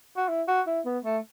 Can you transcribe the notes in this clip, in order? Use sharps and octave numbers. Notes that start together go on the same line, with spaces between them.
F#4
E4
F#4
E4
B3
A3